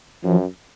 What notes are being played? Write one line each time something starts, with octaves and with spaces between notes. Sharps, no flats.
F#2 F3